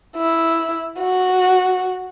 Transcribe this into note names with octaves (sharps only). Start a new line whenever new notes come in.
E4
F#4